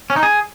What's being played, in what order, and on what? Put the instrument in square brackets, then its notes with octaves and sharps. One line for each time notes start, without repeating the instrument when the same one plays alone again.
[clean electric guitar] C#4
D#4
G#4